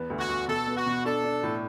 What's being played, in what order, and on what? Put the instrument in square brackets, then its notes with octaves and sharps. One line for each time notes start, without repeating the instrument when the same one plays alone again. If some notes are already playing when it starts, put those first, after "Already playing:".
Already playing: [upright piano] E2 B3
D2
[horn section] F#4
[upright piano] D2
[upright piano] B2 [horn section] A4
[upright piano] B3
[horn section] F#4
[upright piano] B2
[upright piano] D4 [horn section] A4
[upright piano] D4
A2